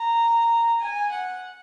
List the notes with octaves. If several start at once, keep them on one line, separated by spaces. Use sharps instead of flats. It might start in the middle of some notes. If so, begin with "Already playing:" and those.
Already playing: A#5
G#5
F#5